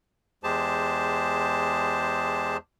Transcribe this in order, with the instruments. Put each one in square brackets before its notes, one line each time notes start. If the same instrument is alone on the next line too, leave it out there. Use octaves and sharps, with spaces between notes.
[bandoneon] E2 G#3 G4 G#4 C5 A5